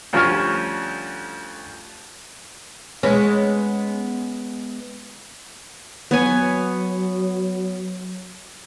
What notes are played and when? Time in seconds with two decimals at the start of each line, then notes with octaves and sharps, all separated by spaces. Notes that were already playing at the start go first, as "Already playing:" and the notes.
0.13 D2 F3 G3 C#4 C#6 F6
3.03 G#3 B3 C#4
6.11 F#3 B3 C#5 G#5